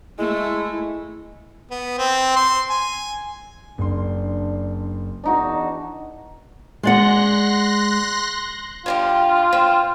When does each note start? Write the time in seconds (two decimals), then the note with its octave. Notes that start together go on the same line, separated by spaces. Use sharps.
0.19 G#3 A3 E4
1.71 B3
1.98 C4
2.36 C6
2.70 G#5
3.78 F#1 D4 C6
5.24 E2 D4 D#4 F#4
6.83 G#3 D5 F#5 C6 F#6 A#6
8.86 D3 G3 F4 G4
9.53 C4